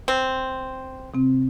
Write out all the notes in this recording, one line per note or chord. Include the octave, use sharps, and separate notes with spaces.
C4
C3 C4